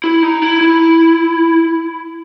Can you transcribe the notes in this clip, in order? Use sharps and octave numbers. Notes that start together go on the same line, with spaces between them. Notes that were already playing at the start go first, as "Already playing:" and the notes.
E4
D#4
E4
E4